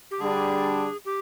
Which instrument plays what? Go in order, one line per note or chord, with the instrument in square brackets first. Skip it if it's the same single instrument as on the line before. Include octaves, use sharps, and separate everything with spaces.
[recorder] G4
[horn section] D3 G3 D4 [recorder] G#4
[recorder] G4